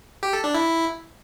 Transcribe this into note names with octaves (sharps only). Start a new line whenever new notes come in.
G4
A4
D4
E4